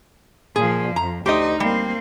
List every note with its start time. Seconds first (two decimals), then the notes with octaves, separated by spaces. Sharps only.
0.56 A#2 F3 G#4
0.96 F2 A#5
1.26 D2 D#4 G4 C5 D#5
1.60 G3 A#3 C4